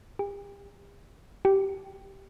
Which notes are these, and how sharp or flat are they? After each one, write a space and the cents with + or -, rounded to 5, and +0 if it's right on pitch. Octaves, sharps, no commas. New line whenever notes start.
G4 +40
G4 -10